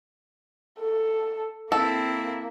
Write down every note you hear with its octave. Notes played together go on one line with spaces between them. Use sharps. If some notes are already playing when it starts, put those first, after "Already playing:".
A4
A#3 C4 E4 A4